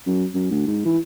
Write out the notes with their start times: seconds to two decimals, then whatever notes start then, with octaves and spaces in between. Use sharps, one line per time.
0.07 F#2
0.35 F#2
0.51 D2
0.67 G#2
0.85 E3